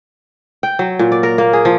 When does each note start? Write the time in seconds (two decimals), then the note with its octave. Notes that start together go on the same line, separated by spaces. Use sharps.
0.63 G5
0.79 F#3
0.99 A#2
1.12 D5
1.23 A#4
1.38 A#3
1.53 G#4
1.65 F3